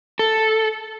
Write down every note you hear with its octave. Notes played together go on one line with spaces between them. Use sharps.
A4